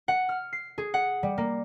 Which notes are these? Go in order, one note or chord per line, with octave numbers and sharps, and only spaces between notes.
F#5
F6
C7
G#4
F#5
G3
A#3